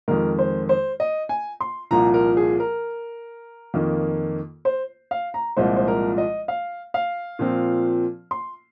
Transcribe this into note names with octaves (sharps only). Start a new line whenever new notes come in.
F2 D#3 G#3 A#4
C5
C5
D#5
G#5
C6
C2 A#2 F3 A#5
A#4
G#4
A#4
F2 D#3 A#3
C5
F5
A#5
C2 A#2 F3 G#3 C5
C5
A#4
D#5
F5
F5
A#2 F3 C4
C6